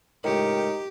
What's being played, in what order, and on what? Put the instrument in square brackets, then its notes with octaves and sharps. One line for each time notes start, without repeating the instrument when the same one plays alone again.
[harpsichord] C#2 A2 [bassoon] D#4 [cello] G4 [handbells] A#4 G5 C#7